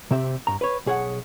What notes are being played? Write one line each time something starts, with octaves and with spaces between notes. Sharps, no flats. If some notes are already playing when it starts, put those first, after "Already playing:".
C3 C4 G4 E5
G2 A#5
B4 C#5
B1 G#4 C#5 F#5